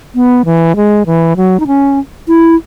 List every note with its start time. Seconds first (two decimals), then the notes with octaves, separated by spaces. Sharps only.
0.15 B3
0.45 E3
0.76 G#3
1.06 E3
1.36 F#3
1.60 D#4
1.67 C#4
2.28 E4